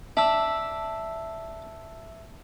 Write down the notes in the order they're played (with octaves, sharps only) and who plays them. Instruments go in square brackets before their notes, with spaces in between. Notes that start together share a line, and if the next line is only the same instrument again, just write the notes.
[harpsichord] D4 [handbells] E5 E6